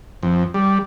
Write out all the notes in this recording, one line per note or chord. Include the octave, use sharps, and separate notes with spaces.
F2
G3